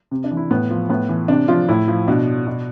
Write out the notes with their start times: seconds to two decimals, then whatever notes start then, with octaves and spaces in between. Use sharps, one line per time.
0.11 C3
0.24 D4
0.31 E3
0.37 E4
0.51 A2 B3
0.71 F3
0.89 A2 B3
1.09 E3
1.28 C3 D4
1.48 F3 F4
1.68 A2 E4
1.88 F3
2.08 B2 D4
2.47 B2